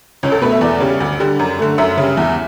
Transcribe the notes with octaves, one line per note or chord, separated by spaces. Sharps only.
C#2 C#4
A4
B2 A3 B4
E5
E2 D5
C#3 G3
D2
D3 G3
F#2
D3 A3
F#2 E5
C#3 G3
E2